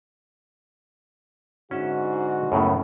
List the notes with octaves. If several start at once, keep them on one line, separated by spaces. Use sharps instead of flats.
G#2 D3 C#4 F#4 E5
F#2 A2 C#3 A#3 B3 A4